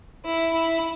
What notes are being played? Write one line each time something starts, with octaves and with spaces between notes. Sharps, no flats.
E4
E4